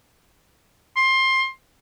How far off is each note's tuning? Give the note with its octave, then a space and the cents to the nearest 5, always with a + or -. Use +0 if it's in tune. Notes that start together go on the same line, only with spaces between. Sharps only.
C6 +20